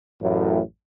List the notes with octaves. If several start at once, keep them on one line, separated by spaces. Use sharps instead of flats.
A1 F#2 A2